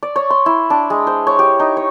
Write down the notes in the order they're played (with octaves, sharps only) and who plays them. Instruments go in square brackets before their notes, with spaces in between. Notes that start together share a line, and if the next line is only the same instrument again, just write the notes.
[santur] D5
C#5
C6
E4
D4
G#3
C5
C#5
G4
D#4
C#5